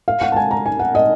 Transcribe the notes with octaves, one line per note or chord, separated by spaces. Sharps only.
F5
F#5
A5
G#5
A#5
G#5
F#5
D#5